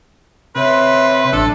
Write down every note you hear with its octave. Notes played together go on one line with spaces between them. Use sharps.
C3 B4 C#5 E5 C6
A1 F#3 D4 A4